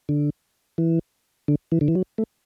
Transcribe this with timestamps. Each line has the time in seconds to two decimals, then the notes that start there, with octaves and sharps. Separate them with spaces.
0.09 D3
0.78 E3
1.48 D3
1.72 E3
1.81 D3
1.88 E3
1.95 F#3
2.18 A3